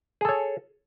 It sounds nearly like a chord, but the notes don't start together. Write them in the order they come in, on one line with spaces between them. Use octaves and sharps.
G#4 A4 C#5